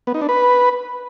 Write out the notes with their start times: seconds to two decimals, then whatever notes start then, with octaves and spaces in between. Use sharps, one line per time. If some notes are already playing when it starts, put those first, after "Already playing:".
0.07 B3
0.14 D#4
0.21 D4
0.29 B4